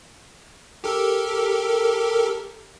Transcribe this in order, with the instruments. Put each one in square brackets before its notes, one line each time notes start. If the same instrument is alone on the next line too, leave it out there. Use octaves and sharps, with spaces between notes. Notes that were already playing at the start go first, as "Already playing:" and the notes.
[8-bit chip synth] G4 A4 A#4